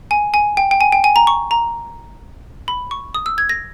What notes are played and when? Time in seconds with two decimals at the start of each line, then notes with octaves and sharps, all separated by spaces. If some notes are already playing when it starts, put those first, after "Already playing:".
0.11 G#5
0.34 G#5
0.57 G5
0.71 G5
0.81 G#5
0.92 G5
1.04 G#5
1.16 A#5
1.27 C#6
1.51 A#5
2.68 B5
2.91 C#6
3.15 D#6
3.26 E6
3.38 G#6
3.49 A#6